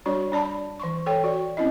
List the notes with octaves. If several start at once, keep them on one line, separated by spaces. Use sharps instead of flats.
G3 D4 F#4 C#5 D5
D4 D5 A5 B5
E3 C6 C#6
A4 C#5 G5
F#4 D5
C4 C#4 E4 D#5